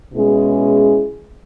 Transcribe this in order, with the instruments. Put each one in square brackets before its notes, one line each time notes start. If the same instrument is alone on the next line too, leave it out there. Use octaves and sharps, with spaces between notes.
[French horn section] B2 G#3 C#4 E4 G#4